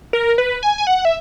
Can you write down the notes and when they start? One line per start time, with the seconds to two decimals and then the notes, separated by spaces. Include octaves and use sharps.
0.13 A#4
0.38 B4
0.63 G#5
0.78 G#5
0.87 F#5
1.05 E5